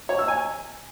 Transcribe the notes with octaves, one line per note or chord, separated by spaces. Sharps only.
C#5
E6
G#5